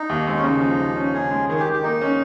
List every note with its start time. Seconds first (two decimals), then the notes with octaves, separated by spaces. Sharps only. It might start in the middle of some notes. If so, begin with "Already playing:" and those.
Already playing: D#4
0.09 D#2
0.27 G#3 C4
0.37 C#4
0.44 C#3 D#4
0.61 F3
0.79 D#2
0.96 C#4
1.14 C#3 G#4
1.31 G#3
1.49 D#3 G#4
1.60 G4
1.67 D#3
1.72 G4
1.83 A#3 D#4
2.01 C#4